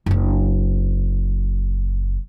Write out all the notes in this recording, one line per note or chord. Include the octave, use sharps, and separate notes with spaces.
F#1 D4